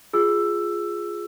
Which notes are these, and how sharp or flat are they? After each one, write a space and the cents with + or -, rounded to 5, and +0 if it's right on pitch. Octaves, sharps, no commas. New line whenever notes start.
F4 +0 G#4 +0 E6 +10